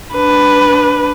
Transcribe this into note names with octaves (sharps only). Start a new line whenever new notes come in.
D4 B4